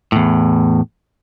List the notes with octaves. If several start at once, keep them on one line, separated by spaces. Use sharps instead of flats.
E2 A2